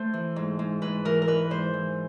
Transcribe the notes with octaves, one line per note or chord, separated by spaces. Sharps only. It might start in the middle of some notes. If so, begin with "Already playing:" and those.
Already playing: A3 C5
E3
G#2
G#2
G#2 B4
E3 A#4
A#4
G#2 B4
G#2 C5
E3